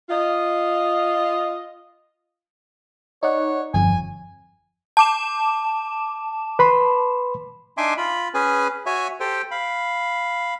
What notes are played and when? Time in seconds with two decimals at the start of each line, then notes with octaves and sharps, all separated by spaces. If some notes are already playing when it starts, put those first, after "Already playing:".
0.09 F4 D#5
3.23 D#4 C#5 D5 F#5
3.74 G1 F2 G#5
4.97 A5 D6 E7
6.59 B4 B5 C6
7.77 D4 D#4 E5 G#5 C6 D6
7.97 F4 B5
8.34 C#4 G#4 B4 G#5
8.86 F#4 C#5 E5 G#5
9.20 G4 A4 C5 G5
9.51 F5 B5